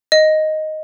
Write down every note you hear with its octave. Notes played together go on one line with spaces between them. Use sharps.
D#5